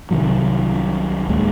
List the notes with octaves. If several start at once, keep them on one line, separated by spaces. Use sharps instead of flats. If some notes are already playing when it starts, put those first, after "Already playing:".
C2 C3 D#3 F#3
D1 D#2 G#3